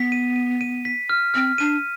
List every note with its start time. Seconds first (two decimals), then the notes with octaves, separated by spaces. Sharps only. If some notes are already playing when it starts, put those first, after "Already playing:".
Already playing: B3 B6
0.12 D#7
0.36 D#7
0.61 D#7
0.85 B6
1.09 F6
1.34 C4 F6
1.58 D4 D#7